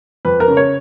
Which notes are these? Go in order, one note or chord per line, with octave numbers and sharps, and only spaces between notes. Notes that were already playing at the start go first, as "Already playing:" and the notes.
F2 B4
A#4
C#3
C#5